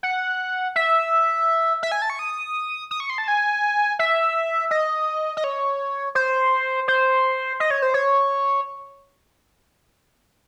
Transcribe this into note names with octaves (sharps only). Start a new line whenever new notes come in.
F#5
E5
E5
G#5
A5
C#6
D#6
D#6
C#6
C6
A5
G#5
E5
D#5
D#5
C#5
C5
C5
D#5
C#5
C5
C#5